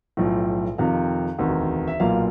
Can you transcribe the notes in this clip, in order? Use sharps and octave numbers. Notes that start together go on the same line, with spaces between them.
B1 A2 F3
F2 C3 D#3 F5
E1 D2 C3 D#3
E5
B1 A#2 F#3 A#3 F5